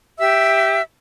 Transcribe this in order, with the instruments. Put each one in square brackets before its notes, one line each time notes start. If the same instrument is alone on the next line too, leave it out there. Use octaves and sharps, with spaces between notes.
[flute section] G4 E5 E6